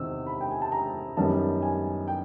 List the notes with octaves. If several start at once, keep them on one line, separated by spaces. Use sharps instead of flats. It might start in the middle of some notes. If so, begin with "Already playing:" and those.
Already playing: E2 C3 D#3 E6
B5
G5
G#5
A5
A#5
F#2 D#3 G3 B3 A5
G#5
G5